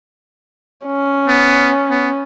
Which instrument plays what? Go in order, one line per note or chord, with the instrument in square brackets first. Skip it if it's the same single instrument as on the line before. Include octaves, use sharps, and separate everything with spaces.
[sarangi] C#4
[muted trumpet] B3
B3